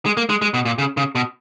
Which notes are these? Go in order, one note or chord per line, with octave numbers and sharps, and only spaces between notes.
G#3
A#3
G#3
G#3
B2
A#2
C#3
C#3
B2